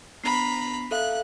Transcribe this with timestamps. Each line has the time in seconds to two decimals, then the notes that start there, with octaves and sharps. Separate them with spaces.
0.24 B3 D4 A#5 B5 C7
0.91 A4 E5 F5 F#6